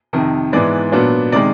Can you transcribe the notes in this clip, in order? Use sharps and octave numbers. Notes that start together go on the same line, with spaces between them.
F2 C3 D#3
G#2 E3 G#3 B3 D5
A#2 F#3 B3 D4
C3 D#3 G#3 D5